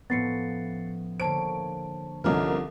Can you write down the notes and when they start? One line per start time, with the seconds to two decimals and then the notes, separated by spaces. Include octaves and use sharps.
0.10 A2 F3 B3 C#4 A6 C7 C#7
1.20 D3 A#3 C5 C#5 A5 D7
2.24 C2 D3 F3 C#4 A#4 D#5 A#5 F6